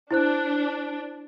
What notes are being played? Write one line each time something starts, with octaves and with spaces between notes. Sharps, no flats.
D4 E4 C5 F#6